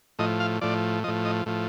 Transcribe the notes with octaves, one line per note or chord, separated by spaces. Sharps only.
A2 F3 D#5
F5
A2 F3 D5
A2 F3 D#5
D#5
A2 F3